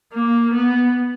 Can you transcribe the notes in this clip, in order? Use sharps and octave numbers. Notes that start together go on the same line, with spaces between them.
A#3
B3